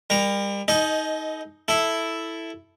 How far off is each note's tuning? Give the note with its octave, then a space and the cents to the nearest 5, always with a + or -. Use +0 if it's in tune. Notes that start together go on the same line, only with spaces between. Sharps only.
G3 +35 A#4 +0
D#4 +15 A4 -45 D#5 +0
E4 +0 A4 +0